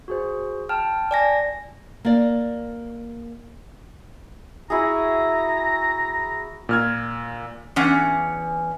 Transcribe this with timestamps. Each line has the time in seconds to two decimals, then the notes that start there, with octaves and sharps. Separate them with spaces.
0.08 F#4 G#4 C5
0.69 G5 A5 F6
1.11 D5 G#5 A#6
2.05 A#3 D5
4.70 E4 F#4 G#4 A#5
6.69 A#2 F6 G#6
7.76 E2 C#4 F#5